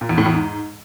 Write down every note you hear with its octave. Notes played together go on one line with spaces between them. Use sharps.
A#2
E2
A2
E2
G#2